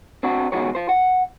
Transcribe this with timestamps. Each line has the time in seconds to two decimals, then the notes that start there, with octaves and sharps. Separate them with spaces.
0.23 C4 D4 F#4
0.52 B2 D#3 F3 G#3 F#4 C#5
0.75 F4 C5
0.89 F#5